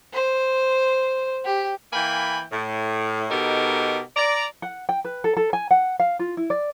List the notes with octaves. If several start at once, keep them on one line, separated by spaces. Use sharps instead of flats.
C5
G4
E3 A#3 G5 G#5 B5
A2
B2 D#4 G4 A4 A#4
D5 A#5
F#5
G5
B4
A4
A4
G#5
F#5
F5
F4
E4
D5